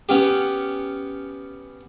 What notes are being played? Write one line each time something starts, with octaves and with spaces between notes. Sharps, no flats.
B3 C#4 G4